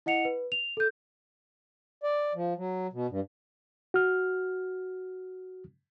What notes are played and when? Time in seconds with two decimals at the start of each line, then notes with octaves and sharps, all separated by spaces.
0.06 E4 D#5 F#5 C#7 F7
0.25 B4
0.52 F7
0.77 A4 G6
2.03 D5
2.35 F3
2.57 F#3
2.93 B2
3.10 G2
3.94 F#4 F6